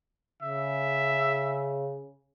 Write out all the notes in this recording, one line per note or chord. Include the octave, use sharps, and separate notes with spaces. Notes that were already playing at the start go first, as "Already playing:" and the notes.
C#3 E5